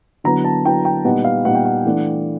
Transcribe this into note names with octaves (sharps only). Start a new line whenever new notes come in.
D3 F#3 B3 E4 A#5
A5
D3 F#3 B3 E4 G5
G5
A#2 G3 B3 D#4 F#5
F5
A#2 G3 B3 D#4 F#5
G5
F#5
E3 A3 D4